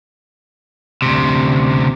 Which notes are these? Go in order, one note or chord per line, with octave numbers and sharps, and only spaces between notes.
D2 C3